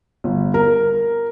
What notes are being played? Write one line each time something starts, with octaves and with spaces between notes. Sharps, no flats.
G1
A#4